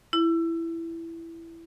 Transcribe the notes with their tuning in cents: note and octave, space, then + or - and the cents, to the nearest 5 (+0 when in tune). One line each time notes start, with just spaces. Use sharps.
E4 +10